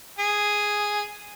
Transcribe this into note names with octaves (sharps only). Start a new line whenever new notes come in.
G#4